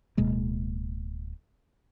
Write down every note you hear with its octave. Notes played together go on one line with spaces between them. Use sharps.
D1 B2 G#3 A#3